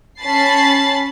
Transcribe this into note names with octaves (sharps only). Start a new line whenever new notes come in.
C#4 A5 B5 A6 C7